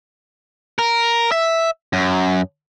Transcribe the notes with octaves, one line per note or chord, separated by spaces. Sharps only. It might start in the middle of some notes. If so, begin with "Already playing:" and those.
A#4
E5
F#2